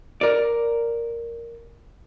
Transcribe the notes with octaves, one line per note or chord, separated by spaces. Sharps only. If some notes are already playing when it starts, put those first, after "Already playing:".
A#4 D5